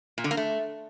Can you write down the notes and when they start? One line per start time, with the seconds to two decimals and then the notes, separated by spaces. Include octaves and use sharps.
0.18 A#2
0.24 D3
0.31 A#3
0.37 A3